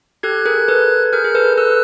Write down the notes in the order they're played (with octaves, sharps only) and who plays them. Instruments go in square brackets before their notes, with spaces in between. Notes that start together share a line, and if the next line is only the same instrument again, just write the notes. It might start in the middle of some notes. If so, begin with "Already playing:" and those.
[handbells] G4 A4 [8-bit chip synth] F#6 G#6
[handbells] G#4 A#4
A4 B4
[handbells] G#4 A#4 [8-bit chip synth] F6 G6
[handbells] G#4
A4 B4
[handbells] A4 B4 [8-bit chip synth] E6 F#6